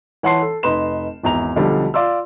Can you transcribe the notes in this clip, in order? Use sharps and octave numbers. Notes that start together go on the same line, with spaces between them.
E3 C#5 F#5 A5 C6 C7
A4
F1 D#4 B4 C6 E7
G#1 E2 A#5 F7
B1 D3 F3 G3
F4 D5 C6 E6